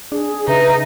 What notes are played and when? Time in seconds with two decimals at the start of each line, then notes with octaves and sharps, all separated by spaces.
0.12 D4 G#4
0.48 C#3 D#4 B4 E5